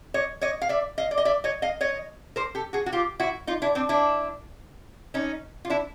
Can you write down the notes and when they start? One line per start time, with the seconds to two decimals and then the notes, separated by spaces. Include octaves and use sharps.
0.14 C#5 D#5
0.41 C#5 D#5
0.62 F5
0.69 D5 E5
0.98 D#5 F5
1.11 D5
1.18 D#5
1.25 D5 E5
1.44 C#5 D#5
1.62 D#5 F5
1.81 C#5 D#5
2.36 A#4 C5
2.55 G4 A4
2.73 F#4 G#4
2.86 F#4
2.92 F4 G4
3.20 E4 F#4
3.47 D#4 F4
3.62 D4 E4
3.75 C4 D4
3.89 D4 E4
5.14 C#4 D#4
5.65 F4
5.70 D4 E4